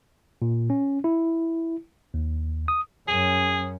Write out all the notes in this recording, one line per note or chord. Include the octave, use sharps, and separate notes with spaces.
A#2
C#4
E4
D#2
D#6
F#2 C#4 G#4